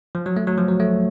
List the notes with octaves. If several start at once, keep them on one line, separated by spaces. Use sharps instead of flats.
F3
F#3
A3
F#3
F3
F#3
A3